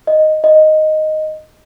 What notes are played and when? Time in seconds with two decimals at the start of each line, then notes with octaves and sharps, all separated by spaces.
0.07 D#5
0.44 D#5